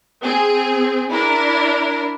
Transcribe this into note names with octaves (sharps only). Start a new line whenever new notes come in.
C4 G#4
D4 E4 A#4